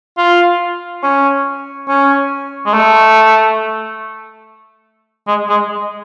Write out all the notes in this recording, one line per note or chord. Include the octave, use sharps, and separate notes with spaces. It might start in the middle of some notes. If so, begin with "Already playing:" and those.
F4
C#4
C#4
G#3
A3
G#3
G#3